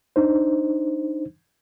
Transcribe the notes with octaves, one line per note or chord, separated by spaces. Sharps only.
D4 D#4 C5